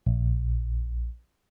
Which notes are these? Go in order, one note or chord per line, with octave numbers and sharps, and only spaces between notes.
A#1